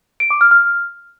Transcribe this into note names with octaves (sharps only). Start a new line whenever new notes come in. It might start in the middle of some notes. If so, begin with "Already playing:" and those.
D7
D6
F6
F6